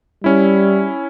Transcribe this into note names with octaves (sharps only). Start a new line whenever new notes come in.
G3 C#4 E4